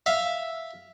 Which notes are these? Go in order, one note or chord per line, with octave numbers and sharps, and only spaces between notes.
E5 F5